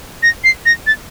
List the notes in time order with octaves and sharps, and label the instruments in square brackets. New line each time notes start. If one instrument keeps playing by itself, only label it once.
[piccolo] A#6
C7
A#6
A6